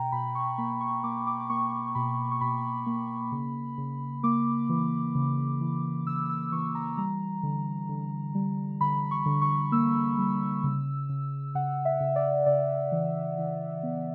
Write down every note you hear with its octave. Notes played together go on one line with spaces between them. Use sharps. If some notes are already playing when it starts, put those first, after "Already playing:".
Already playing: B2 G5 A#5
B2 B5
C#6
A#3 B5
C#6
A#3 D6
D6
D6
A#3 C#6
B2 B5
C#6
B2 B5
A#3
C#3
C#3
A#3 D6
E3
C#3
E3
C#3 E6
E6
E3 C#6
A#5
G3 A#5
D3
D3
G3
D3 B5
C#6
D3
C#6
A#3 E6
G3
C#3
C#3
C#3 F#5
E5
C#3
D5
C#3 D5
E3
E3
B3